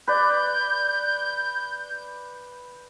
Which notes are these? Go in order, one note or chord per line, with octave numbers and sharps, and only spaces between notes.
B4 D5 G6